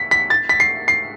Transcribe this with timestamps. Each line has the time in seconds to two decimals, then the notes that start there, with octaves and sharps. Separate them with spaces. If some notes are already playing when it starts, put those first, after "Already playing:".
Already playing: B6
0.11 B6
0.30 A6
0.49 B6
0.60 C7
0.88 C7